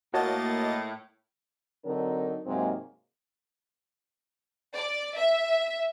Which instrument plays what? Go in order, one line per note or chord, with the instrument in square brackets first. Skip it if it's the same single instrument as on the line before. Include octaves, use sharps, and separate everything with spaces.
[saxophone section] A2 [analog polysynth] A#3 D#5 A6 [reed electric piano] F#4 C#5 A5
[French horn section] D3 F#3 C4 D4 D#4 A#4
G#2 C3 F#3 G#3 A#3 C4
[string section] D5
E5